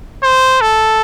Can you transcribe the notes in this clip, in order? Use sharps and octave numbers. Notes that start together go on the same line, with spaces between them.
C5
A4